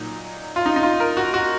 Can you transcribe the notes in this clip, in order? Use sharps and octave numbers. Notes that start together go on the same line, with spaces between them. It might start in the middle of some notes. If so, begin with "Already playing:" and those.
Already playing: A#2 F#3 D#4
F4
D#4
D#4
F4
A#4
F#4
F#4